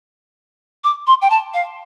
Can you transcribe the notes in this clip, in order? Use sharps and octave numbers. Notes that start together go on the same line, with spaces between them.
D6
C6
G5
A5
F5